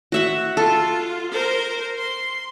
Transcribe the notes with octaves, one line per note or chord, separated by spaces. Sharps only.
F#4 E5 F#5
F4 A4
A#4 C5
C6